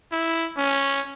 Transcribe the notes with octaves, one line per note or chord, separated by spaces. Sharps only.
E4
C#4